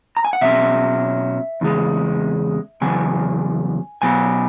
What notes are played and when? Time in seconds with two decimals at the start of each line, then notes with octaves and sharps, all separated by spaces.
0.17 A#5
0.25 G#5
0.33 F#5
0.41 B2 F#3 C#4 E5
1.61 E2 C#3 G#3
2.82 E2 C#3 F#3 G#5
4.02 B2 F#3 B3 G#5